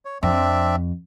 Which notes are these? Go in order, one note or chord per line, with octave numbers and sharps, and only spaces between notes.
C#5
F2 C4 D4 E5